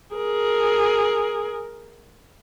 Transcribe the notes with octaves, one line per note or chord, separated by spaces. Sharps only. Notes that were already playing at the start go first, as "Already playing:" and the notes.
G#4 A#4